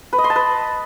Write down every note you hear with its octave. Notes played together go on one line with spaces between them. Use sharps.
B4
D#5
C6
A5
B4